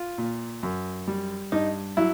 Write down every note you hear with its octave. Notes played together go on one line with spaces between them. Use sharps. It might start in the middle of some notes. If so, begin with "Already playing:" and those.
Already playing: F4
A#2
F#2
G3
G2 D#4
F#3 E4